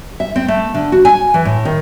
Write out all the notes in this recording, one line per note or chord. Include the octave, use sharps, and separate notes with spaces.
E5
C4
A3
D3
F#4
G#5
E3
A2
D#3